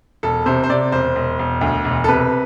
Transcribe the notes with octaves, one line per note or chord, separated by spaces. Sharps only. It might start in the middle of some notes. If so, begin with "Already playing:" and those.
E1 A4
C3 C5
C5
C3 D5
E1 C5
E1
E1
D2
E1
A4
C3 B4